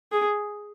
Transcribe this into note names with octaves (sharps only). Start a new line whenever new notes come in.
G#4